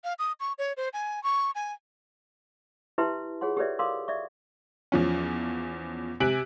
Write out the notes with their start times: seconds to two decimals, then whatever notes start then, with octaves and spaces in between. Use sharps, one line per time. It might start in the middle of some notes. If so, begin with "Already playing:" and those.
0.04 F5
0.19 D#6
0.40 C#6
0.59 C#5
0.77 C5
0.93 G#5
1.24 C#6
1.55 G#5
2.98 E4 G4 B4 E5 A5 C6
3.41 F4 G#4 C#5 F#5 C6
3.57 G4 A4 B4 C#5 D5 E5
3.79 F#4 A#4 F5 C6 D6 D#6
4.08 D5 E5 C#6
4.92 E2 F3 C#4
6.20 C3 G#5 F#6 B6 D7 F#7